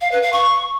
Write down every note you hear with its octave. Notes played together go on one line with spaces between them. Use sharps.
F5
B4
F5
C#6